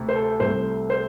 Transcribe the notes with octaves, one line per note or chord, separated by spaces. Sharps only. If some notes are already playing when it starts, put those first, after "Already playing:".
Already playing: D2 C3
C5
A4
C2 C3 A3 C5
C5